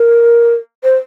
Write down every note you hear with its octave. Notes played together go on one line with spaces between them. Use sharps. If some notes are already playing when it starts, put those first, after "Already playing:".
Already playing: A#4
C5